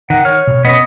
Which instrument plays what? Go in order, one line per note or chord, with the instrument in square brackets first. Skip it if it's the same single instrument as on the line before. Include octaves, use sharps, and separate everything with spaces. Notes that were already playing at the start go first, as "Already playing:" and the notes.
[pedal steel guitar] D#3 [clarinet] F#5
[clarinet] C#5 [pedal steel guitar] F6
[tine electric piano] B2
[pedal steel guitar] B3 C#4 D#6 [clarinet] D#5